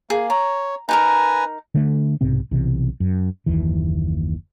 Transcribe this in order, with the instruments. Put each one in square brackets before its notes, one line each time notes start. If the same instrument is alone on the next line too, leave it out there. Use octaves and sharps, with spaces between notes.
[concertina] A#3 [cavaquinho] G#4
[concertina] C#5 [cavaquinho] A#5
[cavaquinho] D#4 G4 A#4 [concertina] B4 G#5 A#5
[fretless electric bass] D3 A3
B1 G#2 C3 C4
B1 C3 E3
F#2
F#1 D#2 E3